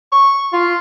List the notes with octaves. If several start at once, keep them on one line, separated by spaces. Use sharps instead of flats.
C#6
F4